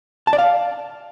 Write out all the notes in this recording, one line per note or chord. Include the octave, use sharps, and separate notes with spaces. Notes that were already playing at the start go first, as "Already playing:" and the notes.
A5
D5
F5